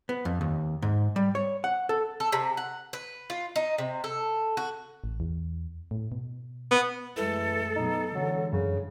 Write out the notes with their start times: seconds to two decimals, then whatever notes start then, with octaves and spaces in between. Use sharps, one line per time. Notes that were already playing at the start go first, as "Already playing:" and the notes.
0.09 B3
0.25 F2
0.41 D#2
0.82 G#2
1.16 G3
1.35 C#5
1.64 F#5
1.89 A4
2.20 A4
2.32 C3
2.57 F#5
2.93 B4
3.30 F4
3.56 D#4
3.78 C3
4.04 A4
4.57 F#4
5.04 A1
5.20 E2
5.91 A2
6.12 B2
6.71 B3
7.17 F#2 E3 G#3 A3 A4
7.76 B2 F#3 B3 D#4
8.15 D3 E3 F#3 G#3
8.53 F#2 C#3